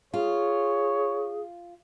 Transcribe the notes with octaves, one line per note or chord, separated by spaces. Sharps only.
F4 G#4 C#5